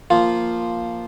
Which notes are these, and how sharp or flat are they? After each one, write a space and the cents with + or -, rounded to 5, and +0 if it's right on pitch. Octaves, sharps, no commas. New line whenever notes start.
F3 -5 A#3 +0 F4 +0